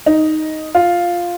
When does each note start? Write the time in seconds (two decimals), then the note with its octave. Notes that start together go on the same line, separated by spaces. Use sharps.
0.06 D#4
0.75 F4